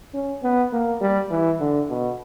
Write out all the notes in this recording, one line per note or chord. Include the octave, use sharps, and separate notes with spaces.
C#4
B3
A#3
G3
E3
D3
B2